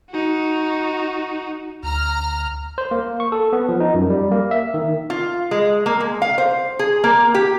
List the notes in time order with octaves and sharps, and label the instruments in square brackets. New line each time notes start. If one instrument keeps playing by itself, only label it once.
[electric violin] D#4 F#4
[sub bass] D2 [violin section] A#5 F6
[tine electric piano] C5
A#3
C#6
A4
B3
F3
D#4
F#2
G3
A#3
E5
D#3
[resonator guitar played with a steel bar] F4
G#3
A#3
G#3
F5
C5
G#4
A#3
G4